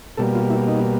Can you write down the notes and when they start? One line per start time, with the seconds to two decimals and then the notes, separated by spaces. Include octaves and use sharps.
0.17 B2 G3 A#3 A4
0.35 F4
0.50 E4
0.68 D#4